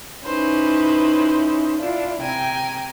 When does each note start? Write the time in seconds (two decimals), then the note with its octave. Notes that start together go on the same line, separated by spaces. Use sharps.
0.25 C#4 D#4 E4 B4 C5
1.79 D4 E4 F4
2.21 C3 G5 G#5 A#5